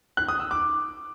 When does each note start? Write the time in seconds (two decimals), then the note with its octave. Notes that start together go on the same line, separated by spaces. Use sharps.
0.17 F#6
0.28 D#6
0.40 E6
0.51 D6